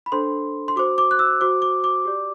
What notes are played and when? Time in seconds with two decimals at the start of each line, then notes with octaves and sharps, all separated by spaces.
0.06 B5
0.12 D4 A4 C5 C6
0.68 C6
0.76 F#4 C5 D6
0.98 D6
1.11 F#6
1.19 E6
1.41 F#4 C5 D6
1.62 D6
1.84 D6
2.05 G4 D5